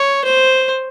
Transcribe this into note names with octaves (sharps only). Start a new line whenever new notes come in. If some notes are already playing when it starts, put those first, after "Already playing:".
Already playing: C#5
C5